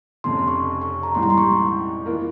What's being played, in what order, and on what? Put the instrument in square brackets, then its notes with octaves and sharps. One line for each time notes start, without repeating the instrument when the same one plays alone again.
[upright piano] F1 F2 C#3 [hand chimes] C6
[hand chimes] C#6
C#6
A#5
[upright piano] A#1 G#2 E3 G3 [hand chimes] C6
[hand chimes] A#5
C6
C#6
[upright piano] E3 A#3 F4 A#4